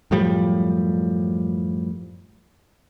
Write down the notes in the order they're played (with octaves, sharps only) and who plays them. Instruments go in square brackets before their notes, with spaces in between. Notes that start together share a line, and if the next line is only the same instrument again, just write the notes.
[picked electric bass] F#2 A2 F3 G3